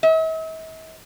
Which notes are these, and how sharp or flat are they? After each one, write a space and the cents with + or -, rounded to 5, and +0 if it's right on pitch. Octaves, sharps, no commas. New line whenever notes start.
E5 -45